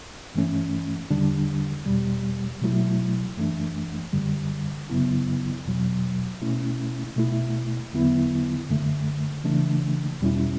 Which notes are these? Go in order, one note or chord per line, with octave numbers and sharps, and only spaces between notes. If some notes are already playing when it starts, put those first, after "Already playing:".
G2 E3 A3 C#4
E2 D3 G3 D4
E2 B2 G3
B2 F#3 A3 E4
F#2 E3 A3 D4
F#2 D3 G3
F#2 C#3 F#3 B3 E4
E2 B2 F#3
B2 A3 C#4 E4
B2 A3 E4
E2 D3 F#3 B3 E4
F#2 D3 A3
C#3 E3 A3 D4
E2 B2 G3 C#4 E4